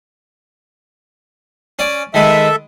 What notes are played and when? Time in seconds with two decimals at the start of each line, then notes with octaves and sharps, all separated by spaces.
1.79 C#4 D5
2.14 D#3 G#3 A4 B4 E5